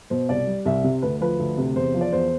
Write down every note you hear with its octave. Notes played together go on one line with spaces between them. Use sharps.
B2 C5
C2 D5
G3
C2 E5
C3
D2 B4
F3 B4
D2
C3
E2 C5
F3
D5
E2 C5